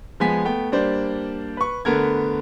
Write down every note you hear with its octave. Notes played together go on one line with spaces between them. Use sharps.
F3 G#3 B3 G#5 B6
A3 B3 G5
G3 A#3 D4 C5 D5
B4 C#6
D3 A3 B3 A#4 G#6